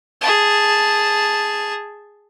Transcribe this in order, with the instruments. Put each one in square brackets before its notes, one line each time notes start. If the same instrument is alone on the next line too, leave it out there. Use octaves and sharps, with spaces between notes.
[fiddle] G#4 A5